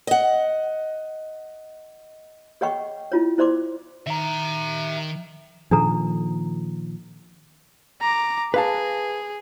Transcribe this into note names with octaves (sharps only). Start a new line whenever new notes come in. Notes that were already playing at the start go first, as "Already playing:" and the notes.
D#5 F#5
G#4 C#5 D#5 F#5 G5 C#6
E4 F4 C#5
E4 C5 D5 C6 D6
D#3 E5 A#5
A#2 D#3 F3 D4 A4 A#5
A#5 D6
G#4 B4 F5 A5